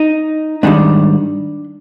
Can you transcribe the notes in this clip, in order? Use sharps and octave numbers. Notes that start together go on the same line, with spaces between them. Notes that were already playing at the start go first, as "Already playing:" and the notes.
Already playing: D#4
G#2 D#3 G3 D4